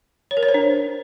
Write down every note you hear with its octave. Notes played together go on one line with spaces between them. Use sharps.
C#5
A#4
C#5
C5
D4